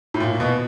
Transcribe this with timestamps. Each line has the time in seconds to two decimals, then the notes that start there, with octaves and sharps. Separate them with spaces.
0.14 A2
0.20 A#2
0.40 B2